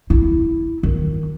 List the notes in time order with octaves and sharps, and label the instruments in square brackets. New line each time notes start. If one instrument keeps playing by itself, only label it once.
[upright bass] E4
D#3